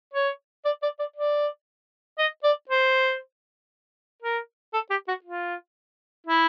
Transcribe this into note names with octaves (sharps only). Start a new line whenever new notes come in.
C#5
D5
D5
D5
D5
D#5
D5
C5
A#4
A4
G4
F#4
F4
E4